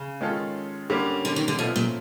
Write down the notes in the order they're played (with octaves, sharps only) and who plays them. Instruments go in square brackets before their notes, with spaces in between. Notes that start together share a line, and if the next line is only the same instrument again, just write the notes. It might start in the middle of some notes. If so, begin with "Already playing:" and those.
Already playing: [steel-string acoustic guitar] C#3
[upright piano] D#3 G#3 C#4 F4 A4
D3 G3 A#3 C#4
[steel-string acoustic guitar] D3
D#3
D3
[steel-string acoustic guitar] B2 [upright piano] F3 A3 C#4 F4 A4
[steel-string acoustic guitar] A#2